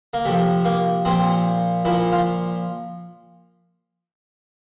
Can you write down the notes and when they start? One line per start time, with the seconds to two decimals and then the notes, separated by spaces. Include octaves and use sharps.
0.13 A#3
0.25 C3 F3 A3
0.65 A#3
1.05 A#2 F3 C4
1.85 A#2 F3 E4
2.12 F4